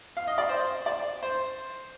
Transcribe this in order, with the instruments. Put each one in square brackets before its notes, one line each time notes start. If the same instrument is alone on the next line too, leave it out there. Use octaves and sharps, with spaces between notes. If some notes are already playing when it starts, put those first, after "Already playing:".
[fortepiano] F5
D#5
D5
C5
D5
C5